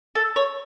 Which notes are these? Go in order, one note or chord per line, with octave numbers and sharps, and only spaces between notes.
A4
C#5